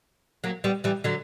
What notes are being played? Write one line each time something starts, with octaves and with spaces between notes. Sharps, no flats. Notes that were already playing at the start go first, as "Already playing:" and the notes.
F#3 A#3
G3 B3
E3 G3
D3 F#3